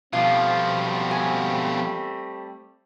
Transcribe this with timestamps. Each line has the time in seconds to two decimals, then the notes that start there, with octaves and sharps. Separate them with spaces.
0.13 B2 F3 G3 A3 C4 F4
1.11 G#5